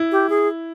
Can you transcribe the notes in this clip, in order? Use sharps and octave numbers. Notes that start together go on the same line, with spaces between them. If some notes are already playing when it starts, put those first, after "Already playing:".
Already playing: E4
G4
G#4